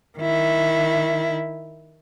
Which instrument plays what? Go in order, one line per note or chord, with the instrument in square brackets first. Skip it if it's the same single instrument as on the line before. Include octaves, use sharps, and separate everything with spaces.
[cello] D#3 E4